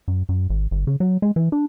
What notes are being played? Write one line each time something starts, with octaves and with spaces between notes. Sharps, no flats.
F#2
F#2
G#1
G1
C#3
F#3
G#3
E3
D4